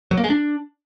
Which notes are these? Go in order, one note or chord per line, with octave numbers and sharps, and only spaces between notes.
F#3
A#3
G#3
D4